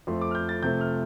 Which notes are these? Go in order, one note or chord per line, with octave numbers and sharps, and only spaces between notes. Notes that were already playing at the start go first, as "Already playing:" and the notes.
F2 F3 A3 C6
D6
F6
G6
A6
C3 F3 A3 G6
F6